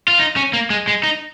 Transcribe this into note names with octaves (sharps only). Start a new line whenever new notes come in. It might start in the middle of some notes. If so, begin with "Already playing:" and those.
F4
D#4
C#4
A#3
G#3
G#3
D#4